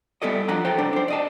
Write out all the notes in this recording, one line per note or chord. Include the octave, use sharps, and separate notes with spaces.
G3 B3 E4 A4 D5 D#5
F3 D4 F#5 A#5
A4 C5 C#5 G5
C2 D4 C5
D4 C5
D5 D#5 A5